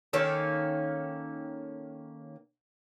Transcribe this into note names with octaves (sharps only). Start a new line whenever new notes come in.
D#3 A#3 C#4 A4